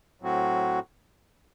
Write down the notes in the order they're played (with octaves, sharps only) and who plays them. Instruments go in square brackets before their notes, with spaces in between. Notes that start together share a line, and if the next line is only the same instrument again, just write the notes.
[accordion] A2 F#3 C4 F#4